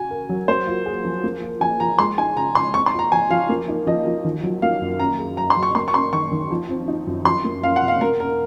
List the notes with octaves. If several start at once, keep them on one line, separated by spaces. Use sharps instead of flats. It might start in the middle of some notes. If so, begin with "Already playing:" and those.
Already playing: C#3 F#4 G#5
A#4
F#3
A#3 C5
F4
G#4
F3
A#3
F4
F3 G#5
F3 A#5
G#3 C6
D#4 G#5
C#3 A#5
C#3 C6
C4 C#6
C6
F4
A#5
F3 G#5
F3 F5
A#3
D#4
F3 D#5
F3
D#3
F#3
A#3 F5
F#2
C#4 A#5
G#4
F#3 A#5
C6
F#3
C#6
A#3 C6
C#6
C#4 C6
D#3 C#6
D#3
F3
C4
D#4
F#2
F3 C6
A#3
C#4 F5
F#5
C3
F5
A#3 A#4
C#4 A#4